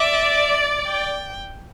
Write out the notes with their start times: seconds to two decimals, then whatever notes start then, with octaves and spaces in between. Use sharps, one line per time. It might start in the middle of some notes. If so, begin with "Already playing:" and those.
Already playing: D5 E5
0.87 G5